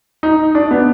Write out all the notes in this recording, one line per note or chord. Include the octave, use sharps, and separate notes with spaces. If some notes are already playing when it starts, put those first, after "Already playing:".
D#4
D4
B3